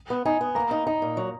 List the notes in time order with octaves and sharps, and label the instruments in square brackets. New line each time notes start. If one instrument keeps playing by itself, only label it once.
[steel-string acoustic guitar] B3
[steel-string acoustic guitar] D#4 [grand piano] G#5
[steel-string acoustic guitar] B3
[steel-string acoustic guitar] A#3 [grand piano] A#5
[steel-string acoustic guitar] D#4
[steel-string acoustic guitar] D#4 [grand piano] A#5
[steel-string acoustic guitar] A#2
F#3